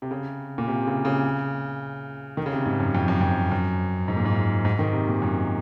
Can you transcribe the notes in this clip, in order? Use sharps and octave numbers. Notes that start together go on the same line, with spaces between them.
C3
C#3
A#2
C3
C#3
C#3
D#3
C#3
C3
G#2
F#2
F2
F#2
F2
F#2
G#2
A#2
G#2
G#2
D#3
C3
A#2
F#2